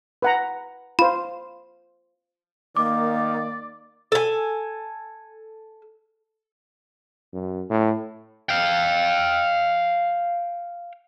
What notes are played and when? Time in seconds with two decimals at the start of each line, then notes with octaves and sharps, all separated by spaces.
0.22 B4 F#5 A#5
0.99 F4 C5 B5
2.76 D#3 A#3 D5 D6
4.12 A4 G#5
7.33 F#2
7.70 A2
8.49 F5 G5